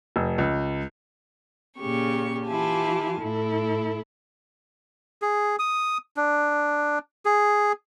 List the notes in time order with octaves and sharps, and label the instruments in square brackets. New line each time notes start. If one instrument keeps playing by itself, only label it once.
[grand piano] F1
C#2
[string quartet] A#2 C#3 G4 C#6
E3 E4 F4 G4 G#5 A5
A2 E4 A4
[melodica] G#4
D#6
D4
G#4